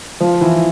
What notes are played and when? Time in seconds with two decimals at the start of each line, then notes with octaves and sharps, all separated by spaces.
0.20 F3
0.41 E3